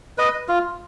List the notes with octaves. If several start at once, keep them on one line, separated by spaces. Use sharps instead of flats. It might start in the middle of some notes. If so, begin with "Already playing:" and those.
B4 D#5
F4